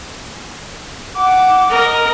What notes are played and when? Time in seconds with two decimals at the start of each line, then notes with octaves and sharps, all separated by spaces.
1.16 F#5 D6
1.69 A#4 D#5